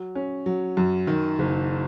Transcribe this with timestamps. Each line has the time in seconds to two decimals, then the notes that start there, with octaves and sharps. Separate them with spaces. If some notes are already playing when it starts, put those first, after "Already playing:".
Already playing: F#3
0.15 C#4
0.46 F#3
0.77 F#2
1.07 D#3
1.39 F#1